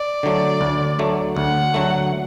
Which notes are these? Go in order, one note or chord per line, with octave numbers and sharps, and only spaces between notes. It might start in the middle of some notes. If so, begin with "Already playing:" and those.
Already playing: D5
D3 F#3 A3
D2
D3 F#3 A3
D2 F#5
D3 F#3 A3